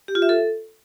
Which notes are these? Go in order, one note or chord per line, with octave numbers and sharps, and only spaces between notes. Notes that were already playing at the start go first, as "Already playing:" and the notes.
G4
F4
E5
A4